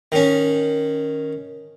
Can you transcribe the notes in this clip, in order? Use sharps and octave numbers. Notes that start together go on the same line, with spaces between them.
D#3 C#4